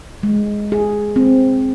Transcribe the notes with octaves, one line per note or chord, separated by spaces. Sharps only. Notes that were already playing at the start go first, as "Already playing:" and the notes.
G#3
G#4
C4